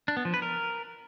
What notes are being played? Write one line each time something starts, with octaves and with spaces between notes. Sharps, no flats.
D4
B3
F3
B4
A#4